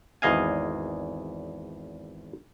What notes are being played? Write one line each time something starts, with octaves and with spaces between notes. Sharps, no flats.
G#1 E2 D#5 F5 G#5